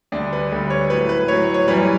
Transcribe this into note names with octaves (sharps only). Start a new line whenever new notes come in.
D2 D3 G3 D4
B4
D2 D3 G3
C#5
A2 F#3 B4
B4
A2 F#3 C#5
C#5
F#2 E3 G3 B4